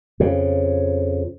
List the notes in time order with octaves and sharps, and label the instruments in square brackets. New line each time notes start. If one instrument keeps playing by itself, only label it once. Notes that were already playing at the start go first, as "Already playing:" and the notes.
[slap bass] F2 C#3